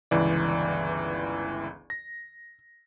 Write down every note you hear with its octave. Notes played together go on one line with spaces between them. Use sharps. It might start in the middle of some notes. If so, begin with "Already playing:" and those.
G1 C#2 E3 D5
A#6